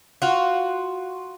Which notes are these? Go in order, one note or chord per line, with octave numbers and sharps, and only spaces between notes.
F4 F#4